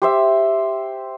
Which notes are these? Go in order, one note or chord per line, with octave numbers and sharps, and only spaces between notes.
G4 C5 E5